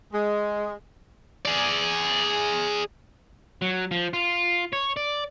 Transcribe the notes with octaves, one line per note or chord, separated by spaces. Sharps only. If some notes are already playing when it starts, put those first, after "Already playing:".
G#3
G#4 D5
F#3
F3
F4
C#5
D5